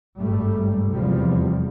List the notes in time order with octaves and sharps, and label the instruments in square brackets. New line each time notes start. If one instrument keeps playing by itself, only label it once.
[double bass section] G#1 G2 G3 A3
F1 E2 C3 F3 G3